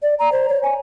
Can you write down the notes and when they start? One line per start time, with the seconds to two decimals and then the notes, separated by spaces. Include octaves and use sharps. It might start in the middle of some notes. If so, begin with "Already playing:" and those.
0.02 D5
0.19 A#5
0.32 C5
0.49 C#5
0.63 G#5